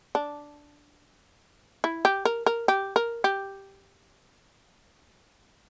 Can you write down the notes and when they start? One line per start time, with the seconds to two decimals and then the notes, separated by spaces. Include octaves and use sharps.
0.15 D4
1.84 E4
2.05 G4
2.25 A#4
2.46 A#4
2.68 G4
2.96 A#4
3.24 G4